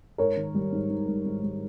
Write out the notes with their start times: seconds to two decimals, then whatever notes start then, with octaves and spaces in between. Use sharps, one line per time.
0.18 G#2 A#4 C#5
0.36 D#3
0.54 G3
0.73 G#2
0.90 G#2
1.07 G3
1.26 G#2
1.43 G3